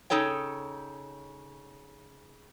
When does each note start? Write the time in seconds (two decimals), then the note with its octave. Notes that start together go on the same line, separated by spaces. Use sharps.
0.10 C#3 D#4 A4 C#5 G5